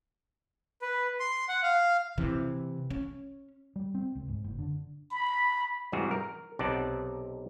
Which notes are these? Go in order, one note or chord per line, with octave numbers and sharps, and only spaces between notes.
B4
C6
F#5
F5
C3 E3
C#4
G3
C4
C#2
G#2
F#1
D3
B5
G#2 C3 E3 G3 F#4 G#4
A#4
B1 C3 D#4 D5 F#5 A5